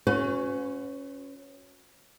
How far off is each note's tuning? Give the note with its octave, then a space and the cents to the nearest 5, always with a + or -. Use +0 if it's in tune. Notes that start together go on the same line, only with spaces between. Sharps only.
C#4 +0 F#4 -35 B4 +40